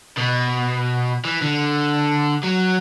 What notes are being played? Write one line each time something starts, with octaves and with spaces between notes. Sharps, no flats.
B2
E3
D3
F#3